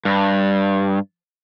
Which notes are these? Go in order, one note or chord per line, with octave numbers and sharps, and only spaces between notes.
G2